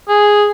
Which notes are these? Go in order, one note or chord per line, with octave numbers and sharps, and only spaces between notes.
G#4